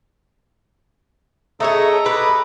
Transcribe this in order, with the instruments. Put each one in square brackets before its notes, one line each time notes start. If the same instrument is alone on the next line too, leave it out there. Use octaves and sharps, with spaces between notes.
[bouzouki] A3 C#4 G#4 [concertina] A4 D#5 A#5
[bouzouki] G4 B4